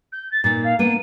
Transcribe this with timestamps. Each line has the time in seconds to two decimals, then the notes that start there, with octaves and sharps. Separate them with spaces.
0.12 G6
0.31 A6
0.44 A#2 A#3 D#4 A6
0.64 F5
0.79 A#3 B3 D4 D#7